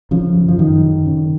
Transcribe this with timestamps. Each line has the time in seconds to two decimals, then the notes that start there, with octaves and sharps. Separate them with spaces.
0.11 C#3 F3
0.35 F#2
0.48 F3
0.58 F#2 D#3
0.83 C#3
1.06 C#3